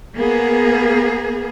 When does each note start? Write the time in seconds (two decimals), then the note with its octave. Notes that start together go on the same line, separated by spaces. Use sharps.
0.14 A#3 B3 G#4